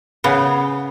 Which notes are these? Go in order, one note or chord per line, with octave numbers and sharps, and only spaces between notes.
C#3 B3